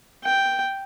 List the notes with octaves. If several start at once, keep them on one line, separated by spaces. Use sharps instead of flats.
G5